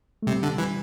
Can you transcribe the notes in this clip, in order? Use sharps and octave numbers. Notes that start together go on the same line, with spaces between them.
A3
C3 G3
D3
E3